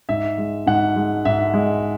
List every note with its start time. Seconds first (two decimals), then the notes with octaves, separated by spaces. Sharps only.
0.09 G#2 E5
0.38 G#3
0.67 G#2 F#5
0.96 G#3
1.25 G#2 E5
1.54 G#3